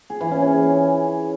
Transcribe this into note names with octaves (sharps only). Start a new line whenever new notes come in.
G#4
E3
C#4
C#4
G#4